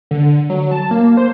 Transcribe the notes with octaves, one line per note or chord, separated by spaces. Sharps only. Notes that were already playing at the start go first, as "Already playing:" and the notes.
D3
F#3
A5
A#3
C5